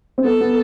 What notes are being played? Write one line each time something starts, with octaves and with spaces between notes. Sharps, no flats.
C4
B3 A4
B3